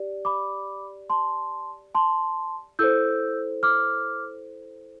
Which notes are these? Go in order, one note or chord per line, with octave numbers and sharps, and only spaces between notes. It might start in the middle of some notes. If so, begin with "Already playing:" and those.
Already playing: G4 D5
B5 D6
A5 C6
A5 C6
E4 A4 C5 E6 G6
D6 F6